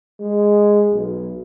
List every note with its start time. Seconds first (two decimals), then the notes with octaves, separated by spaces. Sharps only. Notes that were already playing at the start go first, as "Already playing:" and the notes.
0.19 G#3
0.93 B1